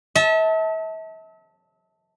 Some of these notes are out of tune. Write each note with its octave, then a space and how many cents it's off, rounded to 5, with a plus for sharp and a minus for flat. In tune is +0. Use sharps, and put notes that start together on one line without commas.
E5 -40 A5 +0